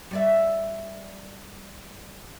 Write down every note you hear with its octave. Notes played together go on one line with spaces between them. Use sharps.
G3 D5 E5